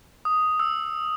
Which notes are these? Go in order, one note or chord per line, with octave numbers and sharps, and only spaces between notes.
D#6
E6